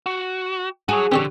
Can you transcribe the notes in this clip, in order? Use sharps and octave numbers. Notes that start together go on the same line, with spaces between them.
F#4
F#4 G#4 C#5
D3 C4 G4 C#5